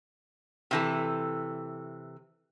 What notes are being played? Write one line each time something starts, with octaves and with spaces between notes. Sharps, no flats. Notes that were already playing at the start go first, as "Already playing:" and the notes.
C3 E3 A4